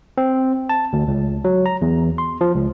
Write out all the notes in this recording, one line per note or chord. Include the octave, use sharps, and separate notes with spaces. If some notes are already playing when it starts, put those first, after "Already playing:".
C4
A5
D2
C#2
F#3
A#5
E2
C6
F3
C#2